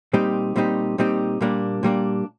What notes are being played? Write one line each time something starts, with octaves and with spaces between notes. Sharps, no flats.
A#2 G3 C4 D#4 G4
A#2 G3 C4 D#4 G4
A#2 G3 C4 D#4 G4
A#2 G3 A#3 D4
A#2 G3 A#3 D4